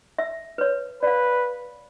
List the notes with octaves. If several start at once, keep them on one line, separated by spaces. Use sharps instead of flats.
E5
B4 C#5
B4 D5 F5